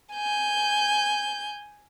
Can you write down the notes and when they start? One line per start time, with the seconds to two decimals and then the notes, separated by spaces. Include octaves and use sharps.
0.14 G#5 G6